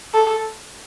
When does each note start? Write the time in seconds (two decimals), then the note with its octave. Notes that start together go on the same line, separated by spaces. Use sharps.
0.14 A4